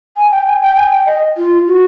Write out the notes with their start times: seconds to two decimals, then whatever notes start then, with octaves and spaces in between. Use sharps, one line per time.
0.17 G#5
0.31 G5
0.46 G#5
0.62 G5
0.76 G#5
0.91 G5
1.06 D#5
1.37 F4
1.67 F#4